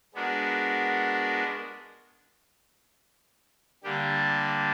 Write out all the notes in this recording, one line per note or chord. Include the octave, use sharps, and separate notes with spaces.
G#3 B3 D4 F#4 A#4
D3 G3 A#3 D4 G4